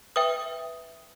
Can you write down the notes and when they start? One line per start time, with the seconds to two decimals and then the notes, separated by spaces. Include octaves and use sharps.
0.16 B4 E5 G5 D#6